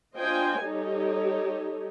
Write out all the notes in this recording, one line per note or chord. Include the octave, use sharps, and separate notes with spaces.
D4 F4 C5 D#5 G5 G#5
G3 D#4 G4 A4 C#5